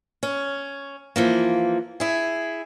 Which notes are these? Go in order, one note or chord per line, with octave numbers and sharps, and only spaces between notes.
C#4
E3 F3 A#3
E4 G#4